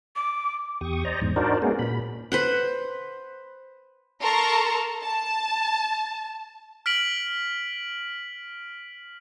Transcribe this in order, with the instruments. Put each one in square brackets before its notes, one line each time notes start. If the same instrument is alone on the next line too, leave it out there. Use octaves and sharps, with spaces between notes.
[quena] D6
[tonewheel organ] E2 G4 C#6 D#6
C5 D5 D#5 A#5
E2 G#2
D4 D#4 F#4 A#4 C5 D5
G#3 A#3 B3 C#4 F#4 G#4
A#2 B5
[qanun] B4 C5 F#5
[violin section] A4 A#4 A5 A#5 C6 C#6
A5
[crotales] F6 B6 D7 F#7